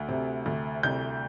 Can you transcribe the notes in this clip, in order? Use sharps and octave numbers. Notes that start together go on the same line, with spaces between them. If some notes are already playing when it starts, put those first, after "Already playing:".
Already playing: D2
C3
D2
C2 G6